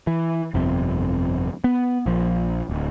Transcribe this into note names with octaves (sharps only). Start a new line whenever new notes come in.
E3
G1 F2 C3
B3
A#1 F3
D1